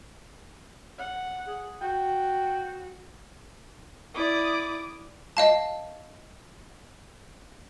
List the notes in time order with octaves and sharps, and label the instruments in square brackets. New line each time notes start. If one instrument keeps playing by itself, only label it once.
[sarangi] F#5
[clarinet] G#4
[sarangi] F#4 [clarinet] G5
[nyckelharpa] E4 D5 [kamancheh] D6 D#6
[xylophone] D#5 F5 A5